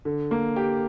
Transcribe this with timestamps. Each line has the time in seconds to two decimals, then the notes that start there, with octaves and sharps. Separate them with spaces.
0.05 D3
0.31 A#3
0.56 G4